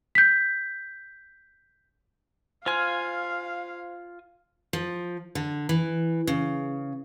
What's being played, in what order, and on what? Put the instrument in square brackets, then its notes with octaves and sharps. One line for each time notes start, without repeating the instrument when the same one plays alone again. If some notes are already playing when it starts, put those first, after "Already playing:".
[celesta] G6 B6
[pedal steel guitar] F4 G#5 [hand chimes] C5 C6 F6 [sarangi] F5
[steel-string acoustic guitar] F3
D3
E3
C#3